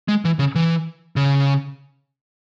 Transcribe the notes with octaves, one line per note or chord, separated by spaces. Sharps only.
G#3
E3
C#3
E3
C#3